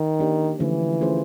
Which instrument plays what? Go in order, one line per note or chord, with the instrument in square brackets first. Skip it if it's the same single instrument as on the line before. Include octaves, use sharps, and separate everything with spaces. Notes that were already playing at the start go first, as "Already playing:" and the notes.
Already playing: [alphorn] D#3
[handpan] A#3 D4 G4
[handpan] D3 F3 A3 C#4 F4 [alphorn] E3
[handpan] A3 C#4 F4 G#4 C5